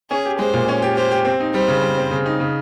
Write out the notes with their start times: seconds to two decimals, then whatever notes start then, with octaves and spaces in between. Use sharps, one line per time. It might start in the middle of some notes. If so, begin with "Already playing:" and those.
0.10 C#4 G#4
0.25 G4
0.39 G#3 C5
0.54 A#2
0.68 C#4
0.82 G4
0.96 G4 C5
1.11 G4
1.25 C4
1.40 D#4
1.54 G3 C5
1.68 C#3
1.82 G3
1.98 C4
2.11 C#3
2.26 D#4
2.40 C#3